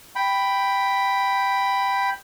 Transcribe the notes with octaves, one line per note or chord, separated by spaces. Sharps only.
G5 B5